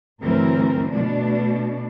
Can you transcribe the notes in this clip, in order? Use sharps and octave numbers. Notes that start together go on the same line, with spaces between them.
D2 G2 E3 F#3 C4 A#4
B2 A3 D4